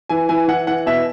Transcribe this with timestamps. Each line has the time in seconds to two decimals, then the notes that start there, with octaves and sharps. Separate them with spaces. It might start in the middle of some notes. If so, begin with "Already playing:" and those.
0.09 E3 G#5
0.29 E3 G#5
0.48 E3 F#5
0.67 E3 F#5
0.86 B2 E5